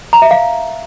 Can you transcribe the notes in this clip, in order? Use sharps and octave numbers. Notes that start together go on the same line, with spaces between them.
A#5
E5
F5